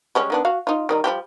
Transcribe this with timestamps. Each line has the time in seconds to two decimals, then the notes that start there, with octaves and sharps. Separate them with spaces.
0.15 G3 G#3 C#4
0.30 D#3 B3 D4
0.45 F#4 F5
0.67 D#4 F4
0.89 D#3 G3 D#4
1.04 F3 G3 G4